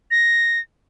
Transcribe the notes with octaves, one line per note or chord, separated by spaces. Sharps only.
A#6